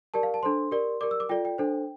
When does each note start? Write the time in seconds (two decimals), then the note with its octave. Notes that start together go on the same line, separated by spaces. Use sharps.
0.14 G4 A#4 D5 A5
0.23 F5
0.34 A5
0.43 D4 A4 C5 C6
0.71 G4 A#4 D5
1.01 G4 A#4 D5 D6
1.11 E6
1.20 D6
1.29 F4 A4 D5 G5
1.45 G5
1.58 D4 A4 C5